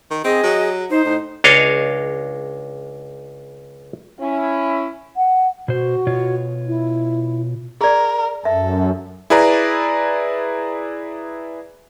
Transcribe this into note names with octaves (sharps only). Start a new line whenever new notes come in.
D#3
C4 G#4 D#5
F#3
D#4 C5
A2 D#4
C#2 D4 C#5 D#5 F5
C#4 E4
F#5
B2 F#4 C5
B2 F4 C#5
E4
G#4 A#4 D5
F#2 A4 E5
E4 G#4 B4 D5 A#5